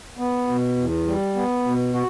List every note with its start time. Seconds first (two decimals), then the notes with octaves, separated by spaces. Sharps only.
0.18 B3
0.47 B2
0.77 E2
1.06 G3
1.35 B3
1.64 B2
1.94 F#4